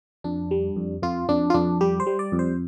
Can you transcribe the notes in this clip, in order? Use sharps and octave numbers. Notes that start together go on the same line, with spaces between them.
F2 D4
G3
F2
F2 F4
F2 D4
F4
F2 D4
G3 G4
C5
G3
D5
F2
C5